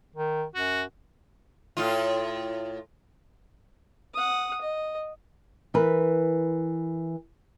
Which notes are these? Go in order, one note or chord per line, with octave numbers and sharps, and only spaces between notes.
D#3
F#2 F#4
A2 F4
F#5 D#6
D#5
E3 A#4 B4